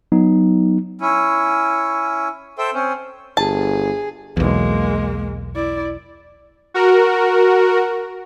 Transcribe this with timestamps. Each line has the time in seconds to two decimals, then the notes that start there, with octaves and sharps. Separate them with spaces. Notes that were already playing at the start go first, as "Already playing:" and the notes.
0.12 F#3 B3 D#4
1.00 C#4 E4
2.58 A4 C5 E5 G5
2.74 C4 C#4
3.37 G1 G#4 A5
4.37 B1 E2 G#3 A#3
5.55 E4 D5
6.74 F#4 A#4